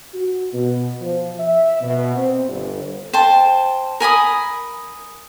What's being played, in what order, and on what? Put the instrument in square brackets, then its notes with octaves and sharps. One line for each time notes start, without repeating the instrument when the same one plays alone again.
[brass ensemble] F#4
B2
F3
E5
B2
C4
G1
[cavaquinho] C5 G5 A5
A#4 G#5 B5 D#6